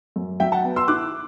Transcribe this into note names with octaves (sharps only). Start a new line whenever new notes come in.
F#2
F#3 E5 G5
F#5 A5
B3
C6 E6
E4 D6 F#6